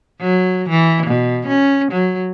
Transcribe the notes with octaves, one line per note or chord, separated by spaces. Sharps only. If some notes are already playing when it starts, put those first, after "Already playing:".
F#3
E3
B2
C#4
F#3